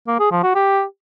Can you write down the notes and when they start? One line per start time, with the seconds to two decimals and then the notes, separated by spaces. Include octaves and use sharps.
0.08 A#3
0.19 G#4
0.31 F3
0.43 F#4
0.55 G4